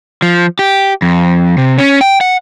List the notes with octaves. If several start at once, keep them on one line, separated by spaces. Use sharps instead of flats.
F3
G4
F2
C3
C#4
G5
F#5